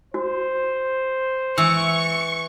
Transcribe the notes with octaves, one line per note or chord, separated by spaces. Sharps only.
F#4 C5
E3 C#6 E6